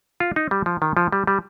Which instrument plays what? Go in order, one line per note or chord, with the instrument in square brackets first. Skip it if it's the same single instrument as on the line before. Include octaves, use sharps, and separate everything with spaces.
[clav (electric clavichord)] F4
D#4
G3
F3
D#3
F3
G3
G3